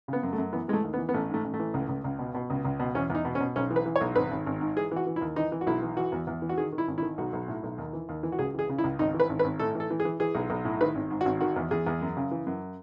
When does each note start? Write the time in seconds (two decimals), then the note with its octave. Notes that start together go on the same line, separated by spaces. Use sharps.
0.08 C#3 B3
0.23 F#2
0.33 A3
0.38 F#2
0.53 E3 B3
0.68 E3 G#3
0.73 A3
0.84 D#2
0.94 B3
0.98 E3
1.09 B3
1.14 A1 A3
1.29 G#2 A3
1.44 A1
1.54 A3
1.59 E3
1.74 C#2
1.89 C#2
2.04 C#2
2.19 B2
2.35 B2
2.50 C#2
2.65 C#2
2.80 B2
2.95 E2 C#4
3.10 E2 D#4
3.25 B2
3.35 C#4
3.40 B2
3.56 B1 C#4
3.70 E3
3.76 B4
3.86 E3
3.96 C#5
4.01 B1
4.15 G#1 B4
4.31 G#1
4.46 G#1
4.61 G#2
4.76 E3 G#4
4.91 E3
4.96 F#4
5.07 E3
5.16 E4
5.21 D#2
5.36 E3 D#4
5.52 E3
5.61 F#4
5.67 B1 E4
5.82 E3
5.97 E3 F#4
6.12 E2
6.27 E2
6.42 E3
6.49 F#4
6.58 D#3 G#4
6.72 D#3
6.78 E4
6.88 G#1
6.98 E4
7.02 D#3
7.18 B1 F#4
7.33 B1
7.48 A2
7.63 B1
7.78 D#2
7.93 E3
8.09 D#2
8.23 E3
8.32 F#4
8.39 C#2 G#4
8.54 E3 G#4
8.69 C#3
8.78 E4
8.84 C#2
8.99 G#1 D#4
9.14 E3
9.20 B4
9.29 G#1
9.39 B4
9.44 G#1
9.59 A2 A4
9.75 E3 A4
9.90 E3
10.00 G#4
10.05 E3
10.20 E3 G#4
10.35 B1
10.50 B1
10.65 A2
10.81 D#3 B4
10.95 G#1
11.11 G#2
11.21 F#4
11.25 G#1
11.40 D#3 F#4
11.56 E2
11.71 E2 G#4
11.87 E2
12.01 F#2
12.17 C#3
12.31 E3
12.47 F#2